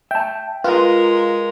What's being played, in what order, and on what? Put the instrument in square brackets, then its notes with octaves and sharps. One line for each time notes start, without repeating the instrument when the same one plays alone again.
[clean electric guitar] E5 A5 [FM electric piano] G5
[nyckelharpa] G#3 A#4 [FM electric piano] F4 [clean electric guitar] B4